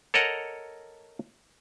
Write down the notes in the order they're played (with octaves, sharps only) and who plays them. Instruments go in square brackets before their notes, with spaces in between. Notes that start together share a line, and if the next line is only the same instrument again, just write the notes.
[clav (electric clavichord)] A4 A#4 C#5 D#5 F#5 A#5